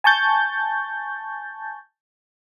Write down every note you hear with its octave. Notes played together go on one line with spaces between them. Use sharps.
G#5 A5 C#6 G6 A6